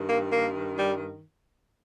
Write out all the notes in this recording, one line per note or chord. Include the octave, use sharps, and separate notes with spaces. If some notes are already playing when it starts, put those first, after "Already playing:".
Already playing: G2 D#3
A#3
A#3
G3